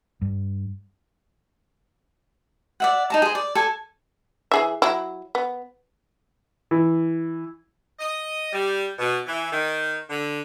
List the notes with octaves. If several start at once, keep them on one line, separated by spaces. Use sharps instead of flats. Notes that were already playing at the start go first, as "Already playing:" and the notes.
G2
D5 E5 F#5
D#4 A5 A#5
G#4 C5
D5
A4 G#5
E3 G#4 E5
F#3 E4
B3
E3
D#5
G3
B2
E3
D#3
D3